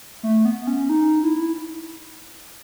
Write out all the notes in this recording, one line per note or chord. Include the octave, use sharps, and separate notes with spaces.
A3
B3
C#4
D#4
E4